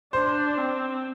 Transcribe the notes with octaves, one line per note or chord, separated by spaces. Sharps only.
D4 C5
C4